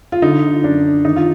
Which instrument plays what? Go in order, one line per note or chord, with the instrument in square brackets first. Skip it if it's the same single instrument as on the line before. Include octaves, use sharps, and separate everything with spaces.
[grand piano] F4
D3 D#4
F#2 D4
D#3 D#4
F4